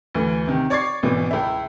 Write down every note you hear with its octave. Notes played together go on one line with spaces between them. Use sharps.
D2 E3
C3 D#3
C#5 D5 C#6 G#6 A6 C7
G#1 B2 E3
C#2 E4